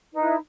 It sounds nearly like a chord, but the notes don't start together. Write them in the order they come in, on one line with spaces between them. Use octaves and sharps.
D#4 B4 E4